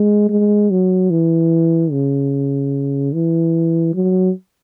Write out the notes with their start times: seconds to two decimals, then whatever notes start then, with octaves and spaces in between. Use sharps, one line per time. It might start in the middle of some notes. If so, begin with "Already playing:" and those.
Already playing: G#3
0.29 G#3
0.71 F#3
1.10 E3
1.91 C#3
3.14 E3
3.94 F#3